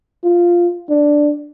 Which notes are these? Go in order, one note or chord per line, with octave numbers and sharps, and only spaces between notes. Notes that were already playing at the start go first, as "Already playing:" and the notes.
F4
D4